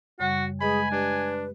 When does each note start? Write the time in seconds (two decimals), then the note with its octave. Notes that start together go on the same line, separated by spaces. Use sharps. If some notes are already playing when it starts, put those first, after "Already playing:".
0.20 F#2 C#3 G3 F#4 F#5
0.61 G#3 G#4 B4 D#5 G#5 B5
0.92 D4 G4 B4